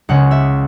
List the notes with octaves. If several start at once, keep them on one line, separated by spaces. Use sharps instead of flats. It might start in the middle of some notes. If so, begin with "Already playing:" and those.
C#2 C#3 G#3 C#4 F#5
E5